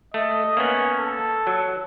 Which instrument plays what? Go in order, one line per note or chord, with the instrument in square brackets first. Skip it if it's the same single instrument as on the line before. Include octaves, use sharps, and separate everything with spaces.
[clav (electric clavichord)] A3 [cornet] D#5
[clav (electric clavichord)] A#3 B3 [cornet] C#4
[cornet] A4
[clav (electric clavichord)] F#3